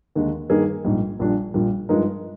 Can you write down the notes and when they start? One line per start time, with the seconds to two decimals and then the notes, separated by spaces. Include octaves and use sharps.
0.15 D#2 D3 G#3
0.50 G2 D#3 A#3 D#4 G#4
0.84 A#1 G#2 G3
1.19 A#1 A#2 G3 D4
1.54 A#1 A#2 G3
1.89 G2 F3 G#3 D#4 A#4